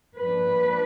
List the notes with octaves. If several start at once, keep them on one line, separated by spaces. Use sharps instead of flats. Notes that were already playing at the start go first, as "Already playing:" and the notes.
F3 A#3 D4 B4